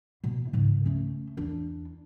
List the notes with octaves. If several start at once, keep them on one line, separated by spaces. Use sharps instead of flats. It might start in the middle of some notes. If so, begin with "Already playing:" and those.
B2
G#2 C#3
A3 C#4
E2 D4